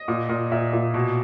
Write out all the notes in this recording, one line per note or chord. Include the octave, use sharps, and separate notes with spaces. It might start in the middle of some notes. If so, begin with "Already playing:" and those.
Already playing: D#5
A#2
A#2
A#2 E5
A#2
B2